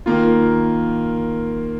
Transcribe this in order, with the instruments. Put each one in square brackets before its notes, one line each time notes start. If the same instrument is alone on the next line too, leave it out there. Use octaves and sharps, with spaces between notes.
[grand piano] D#3 A#3 F4